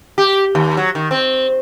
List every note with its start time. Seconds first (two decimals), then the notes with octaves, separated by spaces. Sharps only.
0.18 G4
0.55 D#2
0.77 F#3
0.95 D#3
1.11 C4